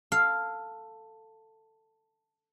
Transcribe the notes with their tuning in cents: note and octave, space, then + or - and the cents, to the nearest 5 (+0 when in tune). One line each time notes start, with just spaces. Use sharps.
A4 +10 F5 +0